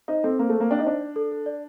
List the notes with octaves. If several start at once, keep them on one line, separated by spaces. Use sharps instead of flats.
D#4 C5
C4 A4
A#3 C5
A3
C5
A#3
D4 G5
D#4
D4 C5
D5
A4
A4
D5